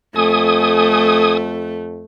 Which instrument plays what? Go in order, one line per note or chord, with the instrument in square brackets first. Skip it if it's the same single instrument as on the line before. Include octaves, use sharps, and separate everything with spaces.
[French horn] F2 [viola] A3 [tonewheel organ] G#5 D#6